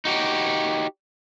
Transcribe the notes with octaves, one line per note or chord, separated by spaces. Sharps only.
D#4 F#4 G4